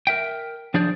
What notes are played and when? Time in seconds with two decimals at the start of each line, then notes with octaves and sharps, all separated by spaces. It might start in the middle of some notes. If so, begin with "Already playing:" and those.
0.07 A#4 E5 G5
0.74 F3 D4 G#4 C5 D5